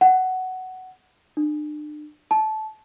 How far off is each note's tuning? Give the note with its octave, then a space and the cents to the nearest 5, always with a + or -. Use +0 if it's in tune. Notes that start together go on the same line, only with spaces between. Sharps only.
F#5 +10
D4 +40
A5 -20